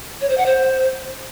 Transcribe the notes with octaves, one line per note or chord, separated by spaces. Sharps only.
C#5
C5
F#5
C5